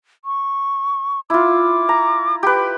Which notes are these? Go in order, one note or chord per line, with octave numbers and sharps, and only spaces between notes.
C#6
E4 F4 D6
A#5
G4 B4 G5